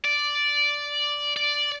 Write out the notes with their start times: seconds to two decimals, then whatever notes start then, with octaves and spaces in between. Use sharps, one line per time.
0.05 D5
1.37 D5